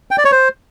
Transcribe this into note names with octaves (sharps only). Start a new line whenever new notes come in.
G5
D5
C#5
C5